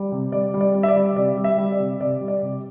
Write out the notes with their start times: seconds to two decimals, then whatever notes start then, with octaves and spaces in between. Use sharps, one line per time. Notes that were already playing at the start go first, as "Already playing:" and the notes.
Already playing: G3 D5
0.12 C3
0.32 G3 D5
0.54 G3
0.61 D5
0.75 G3
0.83 E5
0.88 D5
0.96 G3
1.16 C3 D5
1.37 G3
1.44 E5
1.58 G3
1.72 D5
1.79 C3
2.00 C3 D5
2.21 G3
2.28 D5
2.43 C3